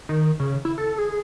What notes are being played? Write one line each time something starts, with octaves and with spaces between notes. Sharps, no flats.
D#3
C#3
E4
A4
G#4